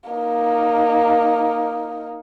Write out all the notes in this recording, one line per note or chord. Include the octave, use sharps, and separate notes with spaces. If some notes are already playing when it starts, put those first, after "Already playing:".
A#3 D#4